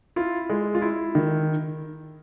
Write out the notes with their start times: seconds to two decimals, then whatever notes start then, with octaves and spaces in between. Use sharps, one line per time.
0.16 E4 F4
0.50 G#3
0.75 F4
0.82 E4
1.15 D#3